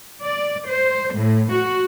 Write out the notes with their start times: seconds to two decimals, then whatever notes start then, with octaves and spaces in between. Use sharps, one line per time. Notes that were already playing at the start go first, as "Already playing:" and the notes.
0.23 D5
0.68 C5
1.15 A2
1.52 F#4